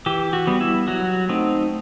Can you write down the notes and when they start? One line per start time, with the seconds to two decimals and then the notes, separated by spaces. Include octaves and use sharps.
0.06 E3 G4
0.33 F#4
0.47 G3 B3
0.61 E4
0.88 F#3 F#4
1.29 A3 C4 D#4